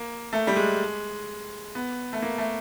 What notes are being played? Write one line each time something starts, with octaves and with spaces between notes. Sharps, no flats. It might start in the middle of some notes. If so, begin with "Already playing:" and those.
Already playing: A#3
A3
G3
G#3
B3
A3
A#3
A3